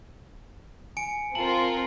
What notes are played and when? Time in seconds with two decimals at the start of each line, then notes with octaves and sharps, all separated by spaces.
0.97 G#5 C#7 D7
1.35 C4 F4 A#4 A5 F#7